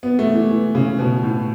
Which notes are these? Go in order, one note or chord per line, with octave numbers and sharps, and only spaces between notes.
B3
A3
E3
E3
C#3
B2
A2